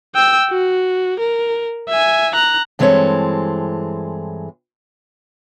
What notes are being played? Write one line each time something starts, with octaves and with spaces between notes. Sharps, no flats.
G5 E6
F#4
A#4
E5 G#5
A#5 F#6
G2 E3 G#3 C4 A4 C#5